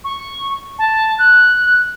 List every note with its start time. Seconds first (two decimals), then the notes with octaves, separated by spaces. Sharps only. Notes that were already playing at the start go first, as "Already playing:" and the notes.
0.04 C#6
0.79 A5
1.19 F#6